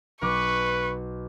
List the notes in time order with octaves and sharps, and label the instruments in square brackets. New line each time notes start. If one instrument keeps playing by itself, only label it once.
[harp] B1 D6 F#6 [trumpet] B4 [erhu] C#6